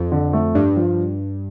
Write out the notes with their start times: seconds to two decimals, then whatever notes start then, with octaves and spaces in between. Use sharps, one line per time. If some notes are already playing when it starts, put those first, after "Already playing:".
Already playing: F2
0.12 D3
0.33 A3
0.55 G2 D4
0.76 F3